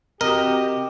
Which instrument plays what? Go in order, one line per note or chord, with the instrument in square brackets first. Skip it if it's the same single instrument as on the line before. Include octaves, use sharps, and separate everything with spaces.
[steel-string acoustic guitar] C3 [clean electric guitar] F#4 D#5 [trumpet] G4 [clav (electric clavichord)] A#4